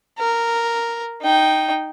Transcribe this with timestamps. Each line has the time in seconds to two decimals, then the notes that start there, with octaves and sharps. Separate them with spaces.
0.19 A#4
1.22 D#4 G5